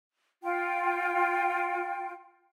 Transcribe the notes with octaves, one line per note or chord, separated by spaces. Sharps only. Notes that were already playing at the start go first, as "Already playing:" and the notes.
F4 G5